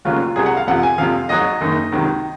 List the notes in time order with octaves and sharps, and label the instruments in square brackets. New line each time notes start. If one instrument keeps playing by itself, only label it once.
[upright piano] F1 D#2 C#3 F#3 F4
C2 C3 F#3 G#4
F#5
F5
F2 C3 F3 F#5
G#5
F2 C3 F3 F5
G#1 G#2 F#3 D#5
F#1 F#2 D#3
C#2 C3 D#3 F#3